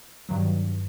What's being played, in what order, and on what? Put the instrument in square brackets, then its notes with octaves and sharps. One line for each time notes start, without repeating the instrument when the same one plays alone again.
[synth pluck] G2 D#3 F#3